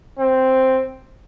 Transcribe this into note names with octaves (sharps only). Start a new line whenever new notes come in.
C4